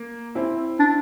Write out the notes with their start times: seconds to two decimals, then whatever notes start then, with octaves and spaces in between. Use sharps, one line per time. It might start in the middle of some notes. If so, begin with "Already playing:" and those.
Already playing: A#3
0.35 C4 E4
0.79 D4